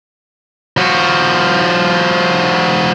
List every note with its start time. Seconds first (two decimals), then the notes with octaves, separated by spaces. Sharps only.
0.77 F3 F#4